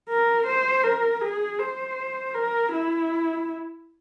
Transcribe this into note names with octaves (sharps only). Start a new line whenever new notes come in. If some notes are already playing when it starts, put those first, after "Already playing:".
A#4
C5
A#4
G#4
C5
A#4
E4